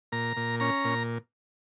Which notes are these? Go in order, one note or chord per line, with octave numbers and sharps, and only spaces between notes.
A#2 A#5
A#2
C#4 A#5
A#2